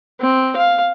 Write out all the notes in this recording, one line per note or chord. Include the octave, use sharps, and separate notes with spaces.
C4
F5